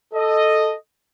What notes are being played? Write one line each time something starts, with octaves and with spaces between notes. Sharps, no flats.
A4 D#5